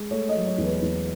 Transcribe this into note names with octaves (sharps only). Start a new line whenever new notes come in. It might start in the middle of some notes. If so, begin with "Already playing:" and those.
Already playing: G#3
A3 C#5
D#5
F#3
C#5
E2
B4
E2